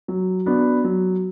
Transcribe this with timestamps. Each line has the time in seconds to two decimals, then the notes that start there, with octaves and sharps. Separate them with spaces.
0.08 F#3
0.46 B3 D4 F#4
0.84 F#3